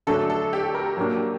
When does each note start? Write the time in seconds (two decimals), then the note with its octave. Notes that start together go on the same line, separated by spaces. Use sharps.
0.07 D3 F#3 A3 D4 A4
0.30 A4
0.53 G4
0.75 A#4
0.97 F#3 A#3 D4